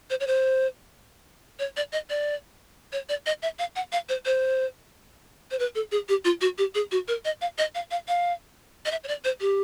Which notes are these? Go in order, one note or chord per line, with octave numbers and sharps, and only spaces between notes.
C5
C#5
C5
C#5
D5
D#5
D5
C#5
D5
D#5
E5
F5
F#5
F5
C5
C5
C5
B4
A4
G#4
G4
F4
F#4
G4
G#4
F#4
A#4
D#5
F5
D#5
F5
F5
F5
D#5
E5
C#5
D5
C5
G4